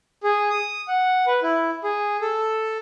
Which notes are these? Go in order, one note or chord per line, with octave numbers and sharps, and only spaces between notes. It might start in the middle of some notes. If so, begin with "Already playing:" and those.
G#4
D#6
F#5
B4
E4
G#4
A4